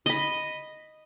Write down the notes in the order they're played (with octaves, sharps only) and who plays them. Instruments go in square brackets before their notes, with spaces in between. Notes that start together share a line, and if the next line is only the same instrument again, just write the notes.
[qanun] D#5 B5